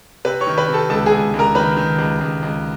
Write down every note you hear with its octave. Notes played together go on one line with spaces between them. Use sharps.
C3 B4 B5
C#5 C#6
D#3
B4 B5
C3
A4 A5
C#2 A4 A5
G#4 G#5
C#2
C#2
A#4 A#5
D#3 B4 B5
D#3
C#2
C#2
C#2